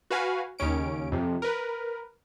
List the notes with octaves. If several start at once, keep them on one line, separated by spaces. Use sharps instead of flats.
F#4 B4 F5 G#5
D#2 C#3 C#4 D7
F2 C3
A#4 B4